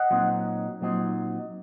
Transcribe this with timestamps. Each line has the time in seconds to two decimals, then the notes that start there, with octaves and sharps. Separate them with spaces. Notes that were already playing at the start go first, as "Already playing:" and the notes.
Already playing: D#5 F#5
0.10 A#2 F#3 C4 D#4
0.81 A#2 F#3 C4 D#4